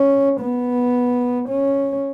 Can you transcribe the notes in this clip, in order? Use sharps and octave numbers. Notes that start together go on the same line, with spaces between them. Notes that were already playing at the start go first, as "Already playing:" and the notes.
Already playing: C#4
B3
C#4